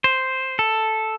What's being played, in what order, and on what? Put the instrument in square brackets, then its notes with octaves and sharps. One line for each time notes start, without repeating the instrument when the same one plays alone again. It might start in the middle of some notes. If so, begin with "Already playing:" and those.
[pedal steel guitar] C5
A4